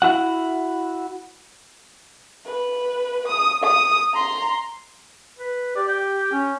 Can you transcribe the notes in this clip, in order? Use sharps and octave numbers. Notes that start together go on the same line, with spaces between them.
E4 F#4 F#5
B4
D#6
D#6
A#5 C6
B4
G4 D5
G5
C#4